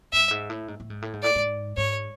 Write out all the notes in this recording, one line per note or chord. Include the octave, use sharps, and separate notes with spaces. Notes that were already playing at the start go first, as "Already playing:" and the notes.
G2 E5
G#2
A2
G#2
A2
G#2
A2
G#2
A2 D5
G#2
G#2 C#5